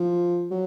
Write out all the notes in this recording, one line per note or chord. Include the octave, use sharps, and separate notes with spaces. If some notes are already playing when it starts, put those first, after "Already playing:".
Already playing: F3
F#3